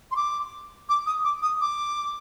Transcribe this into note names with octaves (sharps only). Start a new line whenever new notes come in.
C6
D6
D6
D#6
D6
D#6
D6